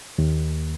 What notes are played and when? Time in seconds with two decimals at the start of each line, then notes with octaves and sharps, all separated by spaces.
0.18 D#2